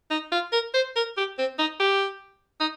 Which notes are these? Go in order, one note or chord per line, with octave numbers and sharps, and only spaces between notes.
D#4
F4
A#4
C5
A#4
G4
C4
D#4
G4
D#4